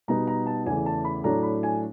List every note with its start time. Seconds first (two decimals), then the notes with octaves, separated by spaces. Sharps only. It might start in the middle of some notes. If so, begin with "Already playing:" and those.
0.08 B2 G3 B3 D#4 A#5
0.27 A#5
0.47 A5
0.66 E2 C#3 E3 A3 G#5
0.86 A5
1.05 B5
1.24 A2 F#3 A3 D4 A#5
1.43 B5
1.63 G#5